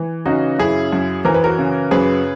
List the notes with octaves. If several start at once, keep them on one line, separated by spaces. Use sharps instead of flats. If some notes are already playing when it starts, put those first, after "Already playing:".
Already playing: E3
C#3 D#4 F#4
F#2 E4 G#4
F#2
E3 A#4
B4
F#4 A#4
C#3
F#2 G#4 B4